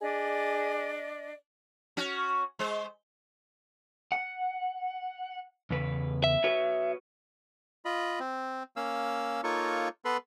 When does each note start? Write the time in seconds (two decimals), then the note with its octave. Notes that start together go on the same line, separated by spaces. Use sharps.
0.01 D4 G#4 D5 D#5
1.97 C#4 F#4
2.59 G#3 C5
4.12 F#5
5.70 E2 C#3 B4
6.24 E5
6.44 F#4 B4 C#5
7.85 F4 D#5 B5
8.20 C4
8.76 A#3 C#4 F5 E6
9.44 A#3 D#4 F4 A4 C#5 C#6
10.05 B3 A4 B4 B5 C6